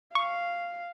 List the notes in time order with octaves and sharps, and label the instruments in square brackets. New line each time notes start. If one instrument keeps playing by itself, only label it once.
[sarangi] F5 [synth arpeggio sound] C#6